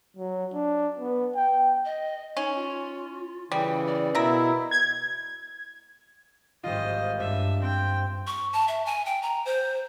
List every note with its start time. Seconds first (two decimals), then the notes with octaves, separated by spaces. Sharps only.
0.17 F#3
0.54 D4
0.99 B3
1.35 G5
1.85 D#5
2.37 C#4 D#4
2.55 F4
3.52 C#3 E3 G3 G5
3.87 D5
4.15 B2 E4 A#4 E5
4.71 G#6
6.64 G#1 G3 F4 C5 D#5
7.20 G2 D4 E5
7.62 C4 G5
8.27 C#6
8.53 A5
8.68 E5
8.86 G#5
9.06 G5
9.22 A#5
9.45 C5